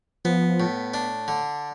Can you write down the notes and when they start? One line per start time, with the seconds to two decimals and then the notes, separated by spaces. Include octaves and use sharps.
0.25 F3 B3
0.60 A2
0.94 D4
1.28 D3